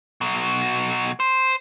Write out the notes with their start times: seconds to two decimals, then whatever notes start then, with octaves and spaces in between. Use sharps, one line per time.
0.21 B2 F#3
1.20 C5